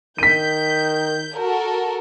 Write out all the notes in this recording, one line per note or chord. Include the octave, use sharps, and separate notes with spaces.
D#3 G6 B6 D#7
F#4 A4 A#4